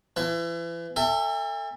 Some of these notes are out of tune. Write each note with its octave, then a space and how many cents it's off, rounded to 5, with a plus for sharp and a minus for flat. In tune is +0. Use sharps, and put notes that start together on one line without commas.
E3 +35 E5 +35
A4 +30 E5 +0 G#5 -45